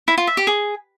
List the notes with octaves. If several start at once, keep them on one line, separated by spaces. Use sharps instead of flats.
E4
F4
E5
G4
G#4